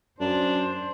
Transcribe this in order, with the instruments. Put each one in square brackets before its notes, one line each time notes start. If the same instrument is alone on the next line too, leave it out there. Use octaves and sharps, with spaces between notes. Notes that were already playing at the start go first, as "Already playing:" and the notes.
[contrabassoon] F#2 [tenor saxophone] D4 [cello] C5